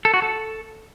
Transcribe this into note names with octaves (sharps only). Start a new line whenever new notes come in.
A4
F#4
A4